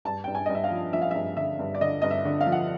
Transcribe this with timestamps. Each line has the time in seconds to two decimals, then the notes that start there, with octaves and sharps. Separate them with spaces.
0.05 G2 A5
0.24 G2 G5
0.35 G#5
0.46 G2 D#5
0.55 E5
0.64 F5
0.71 F3
0.93 F3 E5
1.02 F5
1.11 G2 E5
1.37 D3 E5
1.59 G2
1.75 D5
1.81 D3 D#5
2.02 G2 D#5
2.11 E5
2.25 D3
2.41 F5
2.47 F3
2.52 F#5